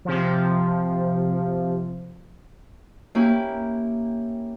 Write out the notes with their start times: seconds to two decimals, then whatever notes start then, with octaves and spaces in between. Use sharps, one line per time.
0.05 C3 F3
3.15 A#3 C#4 E4 G4